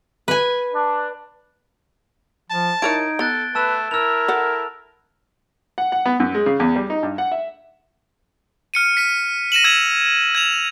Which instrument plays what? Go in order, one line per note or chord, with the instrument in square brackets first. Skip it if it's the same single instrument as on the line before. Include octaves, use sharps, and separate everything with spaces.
[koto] B4 G#5
[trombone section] D4
[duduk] F3 [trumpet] A5
[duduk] D#4 [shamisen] E4 A#4 C#5 [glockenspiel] G#6 D7
[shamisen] B3 [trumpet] A4 [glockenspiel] F#6 A6 G7
[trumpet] A3 [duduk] B4 [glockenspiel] A5 E6 E7
[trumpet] E4 [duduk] A#4 [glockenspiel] E6 F7
[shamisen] A4 F#5
[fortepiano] F#5
F#5
B3
F#2
G#3
C#3
E2
G3
D#4
G2
F#5
E5
[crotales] F6 C#7 D#7
B6 D#7
A#6 D#7 E7 F#7
E6 G#6 E7 F7
G#6 E7 F7